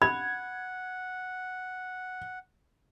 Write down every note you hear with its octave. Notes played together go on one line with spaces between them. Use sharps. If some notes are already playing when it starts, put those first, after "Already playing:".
F#5 B5 G#6